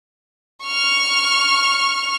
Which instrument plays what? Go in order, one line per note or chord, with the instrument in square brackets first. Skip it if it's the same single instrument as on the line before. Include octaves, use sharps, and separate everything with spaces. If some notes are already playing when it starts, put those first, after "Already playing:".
[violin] C#6 F6